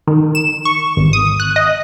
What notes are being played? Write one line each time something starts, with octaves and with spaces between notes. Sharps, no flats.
D#3
E7
C#6
G#1
D#6
F#6
D#5